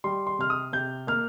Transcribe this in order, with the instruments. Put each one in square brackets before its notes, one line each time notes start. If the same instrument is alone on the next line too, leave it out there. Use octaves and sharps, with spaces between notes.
[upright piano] G3 C6
C6
C3 F6
D#6
C3 G6
A#3 F6